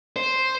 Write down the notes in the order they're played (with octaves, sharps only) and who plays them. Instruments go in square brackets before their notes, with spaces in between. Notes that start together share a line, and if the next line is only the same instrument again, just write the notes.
[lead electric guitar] C5